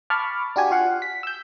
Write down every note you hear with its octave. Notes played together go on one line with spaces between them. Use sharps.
A5 B5 C#6 D6 F6
D4 F#4 G4 G#5
F4 F5 F#5
B6
E6 G6